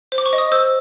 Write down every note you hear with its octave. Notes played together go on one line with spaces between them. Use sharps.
C5
D6
C#6
D#5
D#6
C5 E6